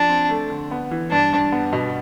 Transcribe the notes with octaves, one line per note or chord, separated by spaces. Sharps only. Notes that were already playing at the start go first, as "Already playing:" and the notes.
Already playing: F3 D4
C4
A3
D3
B3
E3
G2 D4
G2
B3
B2